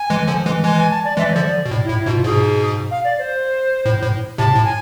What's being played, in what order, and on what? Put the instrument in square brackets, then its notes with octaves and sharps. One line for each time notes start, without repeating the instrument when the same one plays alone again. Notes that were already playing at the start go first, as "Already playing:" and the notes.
Already playing: [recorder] G#5
[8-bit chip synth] E3 G#3
D3 F3
E3 G#3
[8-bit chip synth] E3 G#3 [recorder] G#5
[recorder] G#5
A5
D5
[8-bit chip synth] E3 G#3 [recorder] E5
[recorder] D5
[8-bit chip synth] D3 F3 [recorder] C5
[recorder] D5
[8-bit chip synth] B2
A2
[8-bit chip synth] A2 [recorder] E4
[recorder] E4
[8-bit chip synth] G#2 B2
[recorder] F4
[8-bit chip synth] G#2 B2 [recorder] G#4
[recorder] F5
D5
C5
[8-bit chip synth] A2
A2
[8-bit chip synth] A2 C3 [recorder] A5
[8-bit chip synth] A2
[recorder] G#5